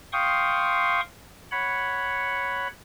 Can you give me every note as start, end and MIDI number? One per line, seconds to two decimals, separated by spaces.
0.13 1.01 77
0.13 1.01 79
0.13 1.01 84
0.13 1.01 85
0.13 1.01 87
1.51 2.68 73
1.51 2.68 78
1.51 2.68 83